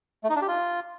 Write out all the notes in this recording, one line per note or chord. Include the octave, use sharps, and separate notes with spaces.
A3
D#4
D4
G4
F4